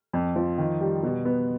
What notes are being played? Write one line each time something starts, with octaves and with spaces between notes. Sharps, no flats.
F2
F3
D#3
G3
B2
B3